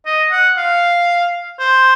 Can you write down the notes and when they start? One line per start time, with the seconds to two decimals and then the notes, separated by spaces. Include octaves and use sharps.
0.06 D#5
0.31 F#5
0.57 F5
1.59 C5